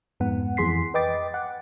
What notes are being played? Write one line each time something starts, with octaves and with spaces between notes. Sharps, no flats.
F2 G#2 B3 F#5
F2 E3 G#4 C6 B6 C7
B4 D#5 G5 D6 A6
F#5